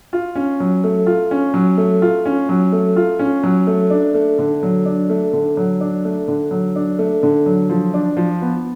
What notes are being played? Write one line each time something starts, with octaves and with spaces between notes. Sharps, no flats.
F4
C#4
F#3
A3
F4
C#4
F#3
A3
F4
C#4
F#3
A3
F4
C#4
F#3
A3
D4
A3
D3
F#3
D4
A3
D3
F#3
D4
A3
D3
F#3
D4
A3
D3
F#3
F3
D4
F3
B3